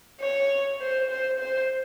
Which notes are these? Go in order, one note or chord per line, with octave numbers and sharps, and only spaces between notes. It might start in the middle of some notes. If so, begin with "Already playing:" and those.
C#5
C5
C5
C5